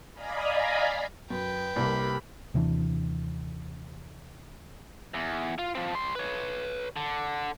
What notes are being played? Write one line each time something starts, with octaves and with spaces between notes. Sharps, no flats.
D5 D#5 F5 G#5 A#5 B5
F#2 B4 G5
C2 C3 A#3 G4 B5
D#2 C3 E3 D4
E2
F4
F3 C4
G3 C6
B4 C#5
D3